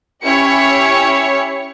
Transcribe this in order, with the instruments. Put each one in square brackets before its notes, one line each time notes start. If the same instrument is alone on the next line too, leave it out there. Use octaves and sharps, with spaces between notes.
[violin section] C#4 E4 G4 C#5 C#7